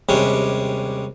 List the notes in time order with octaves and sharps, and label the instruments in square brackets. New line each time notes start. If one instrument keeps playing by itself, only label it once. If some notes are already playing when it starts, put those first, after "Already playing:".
[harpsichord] D#2 C3 G3 G#3 C#4 D4